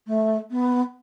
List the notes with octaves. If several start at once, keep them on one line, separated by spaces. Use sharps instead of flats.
A3
B3